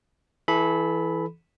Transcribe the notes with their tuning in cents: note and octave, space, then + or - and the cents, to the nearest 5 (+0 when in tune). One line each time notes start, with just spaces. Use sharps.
E3 +0 A4 -30 B5 +0